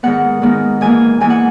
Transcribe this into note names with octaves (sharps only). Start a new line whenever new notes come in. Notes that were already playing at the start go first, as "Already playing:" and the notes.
G#2 D#3 G#3 B3 F#5
G#2 D#3 G#3 B3
G#2 E3 A#3 G#5
G#2 E3 A#3 G#5
F#5